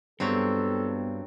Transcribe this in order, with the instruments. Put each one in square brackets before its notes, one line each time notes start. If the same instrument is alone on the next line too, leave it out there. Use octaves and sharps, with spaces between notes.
[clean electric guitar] G2 [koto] F#3 C4 [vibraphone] B3 [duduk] A4